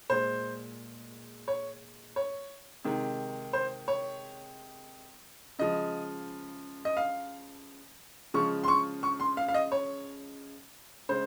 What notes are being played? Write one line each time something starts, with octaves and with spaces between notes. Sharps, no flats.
A#2 G#3 C5
C#5
C#5
C3 D#3 G#3
C5
C#5
C#3 F3 G#3 D#5
D#5
F5
C#3 F3 G#3 C#6
C6
C#6
C#6
C6
F5
F5
D#5
C#5
C#3 G#3 C5